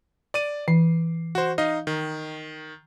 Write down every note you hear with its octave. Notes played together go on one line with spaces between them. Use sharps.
D5 D6 D#7
E3 C7
F#4 C5
D#4 D#5 F5
D#3